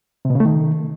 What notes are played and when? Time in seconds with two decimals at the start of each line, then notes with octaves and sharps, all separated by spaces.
0.25 C3
0.30 B2
0.35 C#3
0.40 A3
0.45 D#3